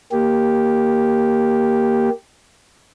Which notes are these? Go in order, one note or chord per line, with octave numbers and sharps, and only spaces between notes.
A#3 G4